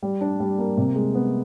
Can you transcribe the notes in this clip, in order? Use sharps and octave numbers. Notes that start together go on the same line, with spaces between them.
G3
D4
G3
A#3
C3
G#3
B3